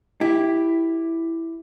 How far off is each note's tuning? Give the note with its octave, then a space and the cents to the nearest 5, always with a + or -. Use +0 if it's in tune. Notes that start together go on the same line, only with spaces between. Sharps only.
E4 +0 G4 +0